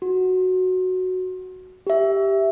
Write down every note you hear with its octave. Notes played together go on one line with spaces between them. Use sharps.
F#4
G4 E5